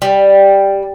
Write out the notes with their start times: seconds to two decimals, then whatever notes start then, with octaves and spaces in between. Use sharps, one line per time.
0.02 G3